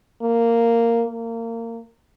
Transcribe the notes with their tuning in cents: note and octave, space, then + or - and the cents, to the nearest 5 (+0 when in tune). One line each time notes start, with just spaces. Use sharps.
A#3 -10
A#3 -25